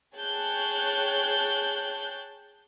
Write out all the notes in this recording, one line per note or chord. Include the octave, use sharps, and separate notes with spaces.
G#4 C#5 G5 A5 F#6 G6